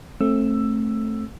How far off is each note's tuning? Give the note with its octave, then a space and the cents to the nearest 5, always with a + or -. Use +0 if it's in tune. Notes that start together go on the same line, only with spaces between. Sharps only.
A3 +0 C4 +30 E6 +10